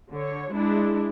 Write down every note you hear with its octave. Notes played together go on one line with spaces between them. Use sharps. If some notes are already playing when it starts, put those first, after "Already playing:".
D3 C#5
G#3 D4 E4